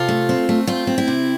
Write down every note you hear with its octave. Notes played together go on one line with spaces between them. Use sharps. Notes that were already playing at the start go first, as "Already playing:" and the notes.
Already playing: C3 F4 A4
A3
C4
A3
C4 F4
C4
E4
C3